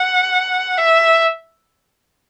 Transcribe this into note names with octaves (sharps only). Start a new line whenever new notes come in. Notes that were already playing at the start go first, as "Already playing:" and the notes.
Already playing: F#5
E5